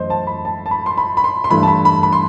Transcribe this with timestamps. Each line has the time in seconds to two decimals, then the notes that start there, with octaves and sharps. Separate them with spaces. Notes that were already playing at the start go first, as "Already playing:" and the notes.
Already playing: F#2 E3 A3 C5 D#5
0.10 A5
0.27 B5
0.45 A5
0.66 A5
0.71 B5
0.86 C6
0.98 B5
1.17 B5
1.24 C6
1.44 C6
1.50 G2 E3 A3 B5
1.63 A5
1.67 B5
1.85 B5
2.03 B5
2.13 C6